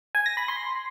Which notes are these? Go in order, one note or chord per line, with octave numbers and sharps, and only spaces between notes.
G#5
A#6
B5
C6